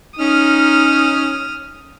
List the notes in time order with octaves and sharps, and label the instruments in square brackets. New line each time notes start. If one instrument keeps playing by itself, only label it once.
[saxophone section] C#4 D#4 [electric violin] D#6 F6